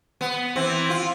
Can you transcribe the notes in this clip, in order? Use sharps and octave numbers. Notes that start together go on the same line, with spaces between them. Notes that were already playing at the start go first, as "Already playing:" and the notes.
B3
E3 C4
F4